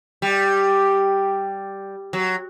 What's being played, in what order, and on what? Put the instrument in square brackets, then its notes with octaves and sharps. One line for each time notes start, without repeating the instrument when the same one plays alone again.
[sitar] G3
F#3